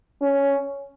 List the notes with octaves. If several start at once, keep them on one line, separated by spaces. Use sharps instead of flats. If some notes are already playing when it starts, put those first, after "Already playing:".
C#4